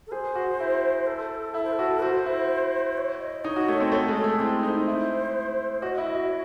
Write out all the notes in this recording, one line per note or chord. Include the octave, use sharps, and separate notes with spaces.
A4
G#4 C5
F#4
E4
A4
E4 A4
C5
A4
F#4
F#4 C5
E4
C#5
D#5
D#4 C#5
F#4
A3
C4
A3
G#3
A4
A3
C4 E4
D#4 C5
E4
F#4 D#5
E4
F#4
C#5